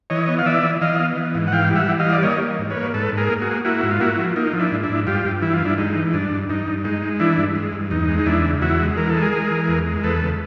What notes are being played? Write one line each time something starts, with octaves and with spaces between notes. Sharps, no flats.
E3 C#5 D#5
B3
F5
E3 D5 E5
E3
E3 D#5 F5
B3
E3
G#2
F#5
E3 F5 G5
G3
E5 F#5
E3
D#5 F5
G3
D5
A#3 C#5 D#5
A#3
G#2
B4 C#5
A#3
G#2 A4 B4
G#2
G#4 A#4
A#3
F#4 G#4
A#3
A#3 E4 F#4
G#2
F4
A#3 E4 F#4
F3
A#3 D#4
F3
D4 E4
G#2
D4 E4
G#2
G2 F4 G4
G2
E3 E4
F4
G2
D4 E4
G#3 D#4
E3
G2 D4
G2
G2 D#4
G2
G#3 D#4
G#3
E3 D4 E4
G2
G#3
G2
E2 D#4
G#3
D#4
E2 D4 E4
C#3
E2 E4 F#4
G#3
E3 A#4
G#3 A4
G#4 A#4
G#3
E3
E2
G#3
E2 A4 B4
C#3